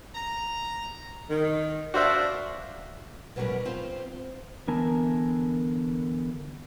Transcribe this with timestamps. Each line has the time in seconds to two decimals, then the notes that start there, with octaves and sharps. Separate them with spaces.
0.15 A#5
1.29 D#3
1.94 D4 F#4 C5 E5 F5
3.36 B2 F#3 G3 C#4 A#4 B4
3.65 C4 F4 C5
4.67 D3 E3 B3 A#4 G#5 A5